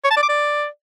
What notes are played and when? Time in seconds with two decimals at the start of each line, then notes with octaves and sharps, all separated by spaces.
0.04 C#5
0.10 A5
0.16 D5
0.23 D6
0.29 D5